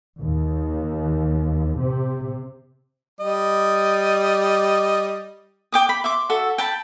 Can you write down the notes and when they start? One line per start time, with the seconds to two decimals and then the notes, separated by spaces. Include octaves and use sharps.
0.20 D#2
1.80 C3
3.20 G3 D#5
5.72 G5 D6 D#6
5.89 B5
6.04 E5 C6 D6
6.29 F#4 A4 E5
6.58 G5 A5 B5